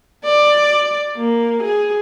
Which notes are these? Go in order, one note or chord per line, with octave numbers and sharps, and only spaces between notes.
D5
A#3
G#4